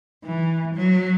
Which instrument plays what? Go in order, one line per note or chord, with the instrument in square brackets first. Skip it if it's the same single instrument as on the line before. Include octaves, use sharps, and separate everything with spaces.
[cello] E3
F#3